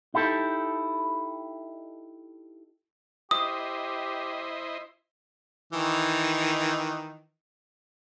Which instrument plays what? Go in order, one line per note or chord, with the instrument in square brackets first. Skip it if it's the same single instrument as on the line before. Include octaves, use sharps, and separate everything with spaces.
[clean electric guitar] D#4 E4 G4 A4
[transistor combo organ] E4 C5 D#5 [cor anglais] G4 [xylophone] D#6
[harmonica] D#3 E3